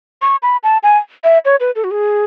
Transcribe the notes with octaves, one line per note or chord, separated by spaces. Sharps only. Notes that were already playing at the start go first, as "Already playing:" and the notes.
C#6
B5
A5
G#5
E5
C#5
B4
A4
F#4
G#4